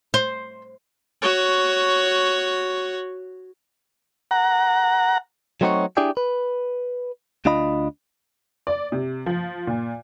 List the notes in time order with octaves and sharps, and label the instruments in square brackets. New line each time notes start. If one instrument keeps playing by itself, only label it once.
[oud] C5
[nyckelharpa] F#4 C#5
[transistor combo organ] F#5 A#5
[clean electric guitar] F#3 A3 C4 D#4 F#4 C#5
D4 E4 G4 G#4 D5 G5
B4
D2 D4 F4 D#5 B5
[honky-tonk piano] D5
C3
F3
A#2